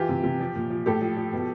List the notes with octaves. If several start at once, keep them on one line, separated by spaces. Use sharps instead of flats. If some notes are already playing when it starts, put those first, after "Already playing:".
Already playing: E3 F4 G4
C3
C3
F3
A#2
F3
A2 G4 A4
F3
F3
B2